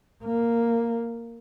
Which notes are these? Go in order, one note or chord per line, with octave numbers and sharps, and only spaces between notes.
A#3